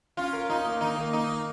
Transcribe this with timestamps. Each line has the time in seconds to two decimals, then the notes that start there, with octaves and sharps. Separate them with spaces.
0.17 C#4 F4
0.33 A#4
0.49 D#4 F4
0.65 A#3
0.81 D#3 D#4
0.96 A#3
1.13 A#3 D#4
1.29 A#3